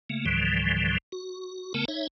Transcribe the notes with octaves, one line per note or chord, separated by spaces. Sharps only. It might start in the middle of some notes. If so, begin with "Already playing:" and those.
C#3 A3 A#3
C#2 G#2 D3 E3 F3 G3
F#4
C#3 A3 B3 A#4 G5 A5
D#4 C#5 E5